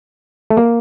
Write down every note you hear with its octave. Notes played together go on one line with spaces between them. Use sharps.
A3
A#3